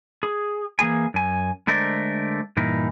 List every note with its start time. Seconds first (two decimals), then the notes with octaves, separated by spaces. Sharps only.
0.23 G#4
0.79 E3 A#3 G#4 G#5
1.14 F#2 G#5
1.67 D3 G#3 A3 A#4 C5 D5
2.57 G2 A#2 E3 D#4